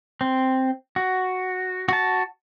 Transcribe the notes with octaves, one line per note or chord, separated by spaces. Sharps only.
C4
F#4
F#4 A5